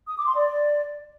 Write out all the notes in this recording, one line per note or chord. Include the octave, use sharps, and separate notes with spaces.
D#6
D6
C6
D5